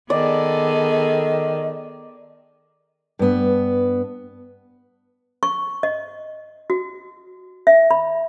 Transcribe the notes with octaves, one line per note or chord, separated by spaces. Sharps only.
D#3 B3 G#4 A4 D5 D#5
G2 B3
C#6
D#5
F#4
E5
B5